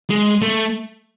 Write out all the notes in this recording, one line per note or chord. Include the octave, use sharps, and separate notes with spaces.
G#3
A3